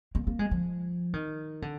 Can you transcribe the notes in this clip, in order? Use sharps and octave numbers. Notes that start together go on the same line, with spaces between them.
A#3
A#3
G#3
F3
D#3
D3